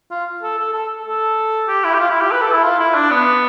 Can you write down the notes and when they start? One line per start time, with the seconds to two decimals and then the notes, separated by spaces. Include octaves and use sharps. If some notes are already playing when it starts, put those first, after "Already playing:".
0.10 F4
0.42 A4
0.58 A4
0.73 A4
1.06 A4
1.68 G4
1.84 E4
1.94 G4
1.99 F4
2.10 E4
2.21 G4
2.32 B4
2.41 A4
2.52 E4
2.63 F4
2.79 E4
2.94 D4
3.11 B3